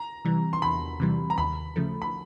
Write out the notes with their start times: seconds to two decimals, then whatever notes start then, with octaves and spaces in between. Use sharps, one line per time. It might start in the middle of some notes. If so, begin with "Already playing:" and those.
Already playing: A#5
0.25 C3 E3 G3
0.53 C6
0.62 E2 B5
1.00 C3 E3 G3
1.30 A#5
1.38 D#2 B5
1.76 C#3 F3 A3
2.02 B5